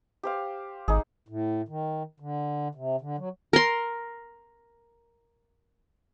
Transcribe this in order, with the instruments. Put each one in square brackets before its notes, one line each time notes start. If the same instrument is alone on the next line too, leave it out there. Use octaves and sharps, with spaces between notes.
[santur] G4 C5 F5
[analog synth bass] G#1 [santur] D#4 G#4
[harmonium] A2
D#3
D3
C3
D3
F#3
[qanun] A#4 C6